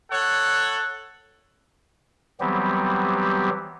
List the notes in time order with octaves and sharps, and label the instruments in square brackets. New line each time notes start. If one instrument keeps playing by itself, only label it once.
[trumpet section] A4 C#5 F#5
[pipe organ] E3 F#3 G3 B3 C4 G4